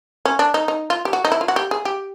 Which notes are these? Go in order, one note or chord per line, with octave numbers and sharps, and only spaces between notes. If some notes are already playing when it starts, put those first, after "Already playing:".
C#4
D4
D#4
D#4
F4
G4
F#4
D#4
E4
F4
F#4
G4
G#4
G4